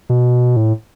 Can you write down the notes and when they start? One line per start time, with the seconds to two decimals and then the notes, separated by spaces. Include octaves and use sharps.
0.09 B2
0.56 A2